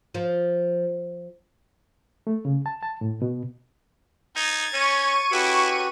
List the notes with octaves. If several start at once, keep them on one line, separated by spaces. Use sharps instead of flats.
F3
A3
C#3
A5
A5
A2
B2
D#4 G#6 A6
C#4 C#5 C#6 D#7
C#4 E4 F#4 G4 A4 B4